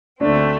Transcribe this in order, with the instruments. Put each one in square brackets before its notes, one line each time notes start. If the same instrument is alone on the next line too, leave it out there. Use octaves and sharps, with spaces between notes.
[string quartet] D2 D3 A3 C4 [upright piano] D4